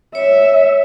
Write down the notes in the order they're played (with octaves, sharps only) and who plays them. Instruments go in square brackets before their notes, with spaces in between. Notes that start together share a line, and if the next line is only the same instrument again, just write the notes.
[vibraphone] C#5 [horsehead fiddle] E5